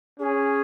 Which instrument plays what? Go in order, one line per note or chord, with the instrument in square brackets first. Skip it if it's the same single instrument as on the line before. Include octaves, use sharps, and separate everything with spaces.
[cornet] C#4 [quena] G#4